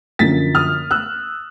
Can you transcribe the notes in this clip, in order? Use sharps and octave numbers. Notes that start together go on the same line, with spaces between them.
F#2 D3 F3 A#3 A6 B6
D#6 F6
E6 F#6